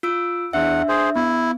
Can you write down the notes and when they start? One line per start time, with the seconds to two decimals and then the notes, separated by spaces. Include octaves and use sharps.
0.03 F4 E6 D7
0.53 E2 D4 E5 F#5
0.89 G#4 C5
1.16 B3 E4